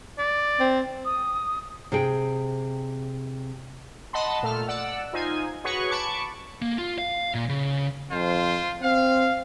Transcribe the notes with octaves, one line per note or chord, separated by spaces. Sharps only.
D5
C4
D#6
C3 G#4 G5
D#5 F#5 A5 B5 C6
A#2 A3 A4 F6
D5 F#5 E6
D#4 F4 C5 G#5
F#4 G#4 B4 C#5 F#5 C#6
A5 B5 C#6 D6 C#7
A#3
F4
F5
A#2
C#3
F2 F4 C5
C4 F5